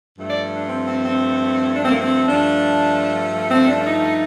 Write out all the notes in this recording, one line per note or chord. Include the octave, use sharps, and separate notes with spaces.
G2 F3 A3
D5
D4
C4
C4
C4
D4
C4
A#3
C4
G2 F3 A3 D4
C4
D4
D4
D#4